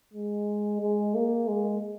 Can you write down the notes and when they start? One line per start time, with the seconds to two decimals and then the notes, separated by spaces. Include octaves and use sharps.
0.13 G#3
0.81 G#3
1.15 A#3
1.48 G#3